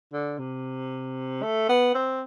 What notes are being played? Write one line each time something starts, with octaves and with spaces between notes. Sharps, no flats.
D3
C3
A3
B3
C4